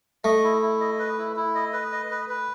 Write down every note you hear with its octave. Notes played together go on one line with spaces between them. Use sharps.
A3 D#5
E4
E4
D#5
B4
E4
E4
D#5
B4
D#5
B4
B4